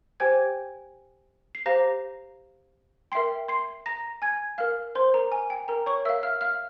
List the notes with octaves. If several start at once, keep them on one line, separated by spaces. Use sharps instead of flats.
G4 C5 G5 G#5 G#6
C7
G4 C5 F5 A#5 A#6
A#4 E5 G5 C6 C7
C6 C7
A#5 A#6
G#5 G#6
A#4 F5 F6
C5 C6
A#4 A#5
G#5
G5
A#4 A#5
C#5 C#6
A#4 E5 F5 E6
F5 F6
F5 F6